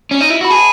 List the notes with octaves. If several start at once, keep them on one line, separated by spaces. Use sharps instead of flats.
C#4
D#4
E4
F#4 B5
G#4 A5